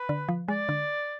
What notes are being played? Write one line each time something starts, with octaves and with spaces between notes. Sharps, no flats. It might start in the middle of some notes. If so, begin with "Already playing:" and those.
Already playing: B4
D3
F3
G#3 D5
D3